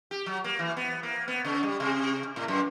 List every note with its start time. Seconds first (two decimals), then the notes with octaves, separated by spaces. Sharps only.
0.11 G4
0.26 F#3
0.44 A#3
0.59 E3
0.77 B3
1.03 A#3
1.28 B3
1.45 C#3
1.63 G3
1.80 C3
2.36 A2
2.48 F#2